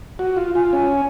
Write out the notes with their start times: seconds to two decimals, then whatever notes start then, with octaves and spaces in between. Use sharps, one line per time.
0.19 F#4
0.37 F4
0.55 F4 G#5
0.73 C#4 G#5